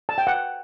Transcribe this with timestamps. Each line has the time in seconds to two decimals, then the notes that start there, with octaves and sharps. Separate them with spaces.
0.09 A5
0.18 G5
0.27 F#5